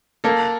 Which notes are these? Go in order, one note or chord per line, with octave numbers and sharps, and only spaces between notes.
A#3 A4